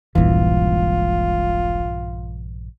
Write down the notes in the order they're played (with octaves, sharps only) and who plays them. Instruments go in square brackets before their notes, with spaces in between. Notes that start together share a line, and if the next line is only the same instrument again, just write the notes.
[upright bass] D#1 G#3 [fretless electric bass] A#1 G2 E3 [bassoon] F4